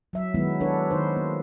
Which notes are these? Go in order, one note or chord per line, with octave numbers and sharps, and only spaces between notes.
F#3 E5
D#3 F#3 G#3 B3 E4
D4 F#4 A4 B4 C#5
D#3 D#4 C5
A#3